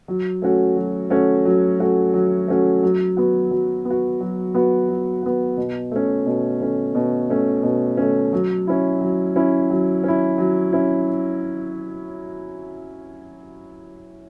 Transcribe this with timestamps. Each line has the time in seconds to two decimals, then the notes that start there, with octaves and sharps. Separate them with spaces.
0.08 F#3
0.42 A3 C#4 F#4
0.76 F#3
1.10 A3 C#4 F#4
1.45 F#3
1.80 A3 C#4 F#4
2.14 F#3
2.48 A3 C#4 F#4
2.83 F#3
3.17 B3 F#4
3.51 F#3
3.85 B3
3.90 F#4
4.21 F#3
4.54 B3 F#4
4.88 F#3
5.23 B3 F#4
5.57 B2
5.91 A3 C#4
6.26 B2
6.61 A3 C#4
6.95 B2
7.30 A3 C#4
7.63 B2
7.97 A3 C#4
8.33 F#3
8.67 C#4 E4
9.01 F#3
9.36 C#4 E4
9.70 F#3
10.04 C#4 E4
10.38 F#3
10.73 C#4 E4